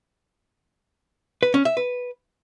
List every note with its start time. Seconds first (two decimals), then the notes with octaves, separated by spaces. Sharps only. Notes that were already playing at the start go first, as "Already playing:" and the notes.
1.43 B4
1.54 C#4
1.65 E5
1.77 B4